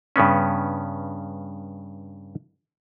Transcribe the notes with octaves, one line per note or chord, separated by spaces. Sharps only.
G2 C#3 B3 C#4